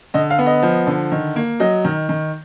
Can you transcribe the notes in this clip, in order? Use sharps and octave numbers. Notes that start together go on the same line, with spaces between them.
D3 D#5
F5
B3
D#5
F3
D3
D#3
A#3
F#3 D#5
D#3
D#3